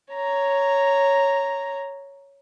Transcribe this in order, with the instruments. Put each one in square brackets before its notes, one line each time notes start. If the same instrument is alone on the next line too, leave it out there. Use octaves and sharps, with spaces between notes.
[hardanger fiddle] C#5 A#5